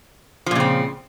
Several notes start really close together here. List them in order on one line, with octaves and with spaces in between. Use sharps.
F3 A#2 C#3 C4